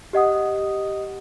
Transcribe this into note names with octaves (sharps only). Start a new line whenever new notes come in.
G4 D#5 F#5 D#6